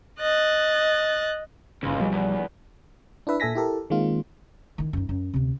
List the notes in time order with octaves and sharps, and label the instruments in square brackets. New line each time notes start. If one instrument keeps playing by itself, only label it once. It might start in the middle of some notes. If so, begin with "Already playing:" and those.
[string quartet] D#5 F#6 A6
[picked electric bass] G1 C#3 [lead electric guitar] C#2
[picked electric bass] B1 F3 G3
[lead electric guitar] E2
[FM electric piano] D4 E4 B4 E5
A#2 A4 E5 G#5 A#6 B6
E4 G4 A4 A#4
D#3 G#3 A#3 C4 F4
[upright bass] D#3 E4
F#2 D#4
F#2
D2 C3